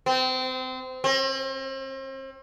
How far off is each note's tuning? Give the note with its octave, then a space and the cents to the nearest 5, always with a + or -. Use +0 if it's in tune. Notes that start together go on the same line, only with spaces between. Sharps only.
C4 -25
C4 +40